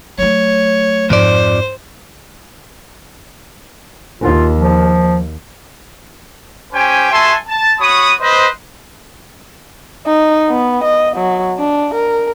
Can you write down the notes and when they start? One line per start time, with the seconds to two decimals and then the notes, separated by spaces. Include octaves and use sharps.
0.18 F#3 A3 C#5
1.10 F2 G#2 F3 C5 D5
4.21 D#2 F4
4.57 F3
6.72 C#4 G4 C5 G5 G#5
7.11 F#4 A4 E5 G#5 A5 C6
7.47 A5
7.79 F#4 C#5 B5 D#6
8.20 B4 C5 D#5
10.07 D#4
10.49 B3
10.84 D#5
11.17 F#3
11.59 D4
11.95 A#4